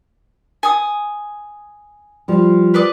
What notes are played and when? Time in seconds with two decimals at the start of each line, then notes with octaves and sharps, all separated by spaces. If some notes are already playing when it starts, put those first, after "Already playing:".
0.63 G#5 D#6
2.28 F3 G3
2.74 B4 D5 D#5